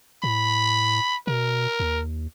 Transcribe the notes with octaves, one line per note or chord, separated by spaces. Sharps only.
A2 B5
B2 A#4
D#2